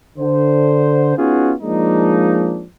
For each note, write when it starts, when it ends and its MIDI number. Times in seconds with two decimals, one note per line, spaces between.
0.18 1.15 50
0.18 1.15 72
1.17 1.54 59
1.17 1.54 61
1.17 1.54 63
1.17 1.54 65
1.17 1.54 66
1.17 1.54 68
1.61 2.65 53
1.61 2.65 56
1.61 2.65 58
1.61 2.65 62
1.61 2.65 63